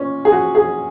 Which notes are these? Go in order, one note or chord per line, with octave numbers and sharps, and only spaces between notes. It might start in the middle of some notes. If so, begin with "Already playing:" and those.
Already playing: A#2 C#4
G#4
F#4
G#4